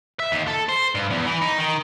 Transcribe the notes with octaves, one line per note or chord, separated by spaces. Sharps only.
E5
D#2
A4
C5
G2
E2
E3
D#4
D#3